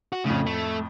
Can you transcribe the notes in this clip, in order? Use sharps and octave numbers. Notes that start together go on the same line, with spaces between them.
F#4
F2 A2 C#3
A3